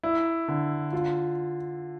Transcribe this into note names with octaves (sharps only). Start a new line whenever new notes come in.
E4
D3
F4